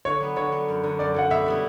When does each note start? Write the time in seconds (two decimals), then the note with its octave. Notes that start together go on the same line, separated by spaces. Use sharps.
0.05 D3 C#5
0.20 F#3 B3
0.36 D3 C#5
0.52 F#3 B3
0.68 F#2
0.83 D3 F#3
0.99 F#2 D5
1.14 D3 F#3 F#5
1.30 B2 E5
1.46 G3 B3 E4